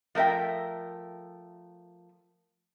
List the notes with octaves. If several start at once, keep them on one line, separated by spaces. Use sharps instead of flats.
F3 A3 A#4 E5 G5